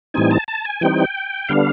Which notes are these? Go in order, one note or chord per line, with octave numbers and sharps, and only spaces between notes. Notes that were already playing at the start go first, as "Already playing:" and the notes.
A2 E3 G3 C4 D#4 G#5
A5
A5
G#5
E3 G3 C4 D#4 G5
D3 G3 B3 D4 F5